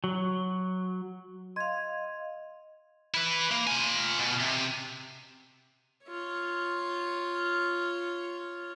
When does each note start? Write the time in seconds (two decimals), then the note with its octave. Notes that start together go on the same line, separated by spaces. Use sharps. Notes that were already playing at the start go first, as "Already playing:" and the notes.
0.04 F#3
1.56 D#5 F5 C6 G#6
3.14 E4 B4
3.51 A#3
3.67 F4 G#5
4.19 B2
4.40 C3
6.06 F4 C#5